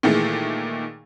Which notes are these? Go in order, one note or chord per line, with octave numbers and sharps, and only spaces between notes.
A#2 D#3 E3 G#3 A3